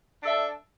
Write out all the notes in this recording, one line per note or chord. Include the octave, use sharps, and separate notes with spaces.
D4 A4 E5